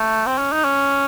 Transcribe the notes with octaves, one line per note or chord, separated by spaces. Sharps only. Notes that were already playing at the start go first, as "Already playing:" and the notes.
Already playing: A3
C4
C#4
D#4
C#4